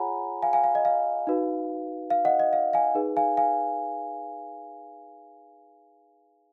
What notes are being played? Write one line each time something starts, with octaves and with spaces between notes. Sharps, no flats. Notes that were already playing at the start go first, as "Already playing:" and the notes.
Already playing: F4 G#4 C#5 F#5 G#5 A#5 B5
F5 G#5
F5 G#5
F5
D#5
F5
D#4 F#4 B4
F5
D#5 F#5
D#5
F5
F5 G#5
D#4 G#4 B4
F5 G#5
F5 G#5